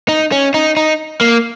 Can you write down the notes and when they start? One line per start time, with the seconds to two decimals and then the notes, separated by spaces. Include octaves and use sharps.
0.08 D#4
0.32 C#4
0.54 D#4
0.77 D#4
1.21 A#3